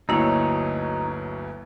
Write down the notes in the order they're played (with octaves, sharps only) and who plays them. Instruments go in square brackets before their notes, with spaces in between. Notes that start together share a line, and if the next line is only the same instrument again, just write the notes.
[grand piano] G1 D2 F#3 [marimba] A#3 E4 [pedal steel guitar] D#4 C#5